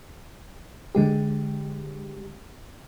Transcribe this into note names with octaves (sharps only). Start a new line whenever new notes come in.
D3 G#3 G4